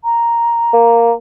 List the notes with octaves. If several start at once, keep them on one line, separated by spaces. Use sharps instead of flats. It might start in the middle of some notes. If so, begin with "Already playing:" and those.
A#5
A#3